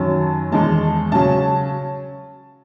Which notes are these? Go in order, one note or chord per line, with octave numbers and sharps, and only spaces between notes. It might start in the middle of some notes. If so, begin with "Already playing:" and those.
Already playing: F#2 D#3 F#3 A5
E2 D#3 G#3 D#4 A5
C#3 F#3 C#4 A5